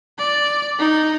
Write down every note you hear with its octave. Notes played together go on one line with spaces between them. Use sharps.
D5
D#4